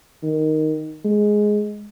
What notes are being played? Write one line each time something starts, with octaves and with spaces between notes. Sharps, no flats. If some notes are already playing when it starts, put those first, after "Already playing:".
D#3
G#3